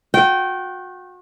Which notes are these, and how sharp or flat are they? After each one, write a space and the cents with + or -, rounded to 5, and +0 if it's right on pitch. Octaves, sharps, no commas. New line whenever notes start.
F#4 -35 G5 -20